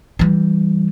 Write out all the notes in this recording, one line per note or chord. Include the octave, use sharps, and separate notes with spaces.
E3 G3